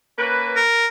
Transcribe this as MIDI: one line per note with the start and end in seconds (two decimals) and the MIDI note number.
0.18 0.61 58
0.18 0.61 61
0.18 0.61 71
0.56 0.87 70